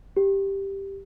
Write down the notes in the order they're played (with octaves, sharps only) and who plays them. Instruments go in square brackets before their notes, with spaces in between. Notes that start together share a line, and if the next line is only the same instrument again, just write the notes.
[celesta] G4